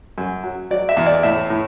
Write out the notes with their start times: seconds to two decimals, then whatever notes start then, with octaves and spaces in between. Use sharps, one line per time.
0.18 F#2
0.44 F#3
0.70 F#3 D5
0.89 E5
0.97 E2
1.06 D5
1.23 A2 E5
1.50 A2